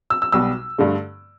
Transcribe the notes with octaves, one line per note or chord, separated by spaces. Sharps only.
E6
E6
B1 B2 G3 B3 E6
G2 D3 A3